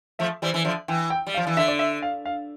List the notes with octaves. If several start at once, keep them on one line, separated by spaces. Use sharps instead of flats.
F3 A3 E5
E3 G3 C5
E3
D3 F3 E5
E3 G5
G5
G3
F5
F3
E3
D3 E5
D5
E5
F5
F5